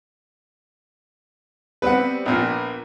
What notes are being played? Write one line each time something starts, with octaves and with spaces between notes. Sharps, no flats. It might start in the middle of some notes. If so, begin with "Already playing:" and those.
G3 B3 C4 B4 F#5
A#1 A#2 B3